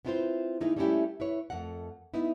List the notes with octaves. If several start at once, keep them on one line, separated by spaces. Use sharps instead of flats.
B3 C4 E4 F4 B4 C5
D#3 A#3 D#4 E4 G#4
G3 A3 A#3 C#4 E4 G4
E4 B4 C#5
F2 A3 A#4 F#5
B3 D#4 E4